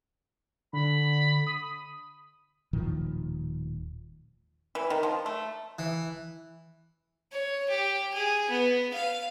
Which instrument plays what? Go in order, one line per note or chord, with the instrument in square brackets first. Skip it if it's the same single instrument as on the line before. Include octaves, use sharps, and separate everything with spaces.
[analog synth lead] D3 [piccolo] B5
[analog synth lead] D#6
[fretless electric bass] D#1 A2 D#3 F3
[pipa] E3
D#3
F3
A3
[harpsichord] E3
[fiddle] C#5
G4
G#4
B3
F5